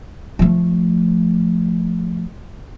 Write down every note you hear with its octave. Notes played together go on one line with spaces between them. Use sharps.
F3 A3